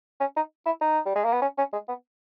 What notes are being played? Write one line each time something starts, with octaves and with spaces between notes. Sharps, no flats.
C#4
D#4
E4
D#4
G3
G#3
A#3
B3
C#4
C#4
G#3
B3